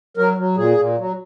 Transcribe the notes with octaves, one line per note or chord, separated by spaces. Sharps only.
F#3 A#4
F#3
A#2 G#4
A#2
F#3